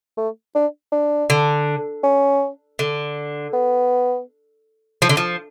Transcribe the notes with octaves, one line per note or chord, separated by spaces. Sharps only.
A3
D4
D4
D3
C#4
D3
B3
F3
D3
F3